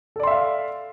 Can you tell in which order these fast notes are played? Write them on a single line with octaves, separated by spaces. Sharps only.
A4 D5 C6 E5 F5